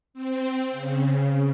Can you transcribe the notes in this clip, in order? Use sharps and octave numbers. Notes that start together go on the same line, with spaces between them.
C4
C#3